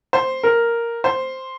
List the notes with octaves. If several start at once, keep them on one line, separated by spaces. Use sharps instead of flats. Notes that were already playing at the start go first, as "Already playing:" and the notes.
C5
A#4
C5